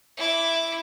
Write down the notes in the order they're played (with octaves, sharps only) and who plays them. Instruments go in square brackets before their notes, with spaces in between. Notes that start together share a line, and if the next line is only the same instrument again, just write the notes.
[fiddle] E4 D6